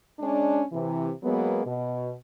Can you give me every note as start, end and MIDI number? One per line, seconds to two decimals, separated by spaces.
0.20 0.61 56
0.20 0.61 61
0.20 0.61 62
0.72 1.09 48
0.72 1.09 52
1.23 1.63 54
1.23 1.63 56
1.23 1.63 58
1.23 1.63 59
1.65 2.12 47